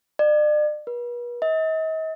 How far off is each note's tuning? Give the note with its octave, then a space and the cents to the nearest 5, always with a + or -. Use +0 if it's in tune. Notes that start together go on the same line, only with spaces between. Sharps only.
D5 +40
B4 -40
D#5 +40